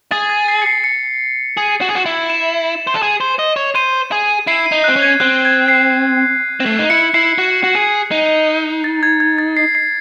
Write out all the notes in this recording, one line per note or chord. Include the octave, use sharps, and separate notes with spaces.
G#4 A6
A6
C7
C#7
C7
C#7
G#4
F#4
G#4
F#4
E4
E7
C5
A4
G#4
C5
D#5
C#5
C5 D#7
G#4
E4 C7
D#7
D#4
F#6
C4
C#4
G#6
C4 F#6
G#6
C7
C4
A3 C7
D#4
E4 C#7
E4 C7
F#4
F#4
G#4
D#4
A6
G#6
G#6
A6
C7
C7